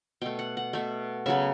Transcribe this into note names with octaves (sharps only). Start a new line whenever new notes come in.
B2 A3 G5
F#5
F#5
B2 A3 E5
C#3 F#3 B3 E5